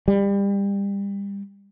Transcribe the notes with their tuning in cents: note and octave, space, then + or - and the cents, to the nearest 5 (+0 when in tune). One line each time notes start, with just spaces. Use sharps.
G3 +30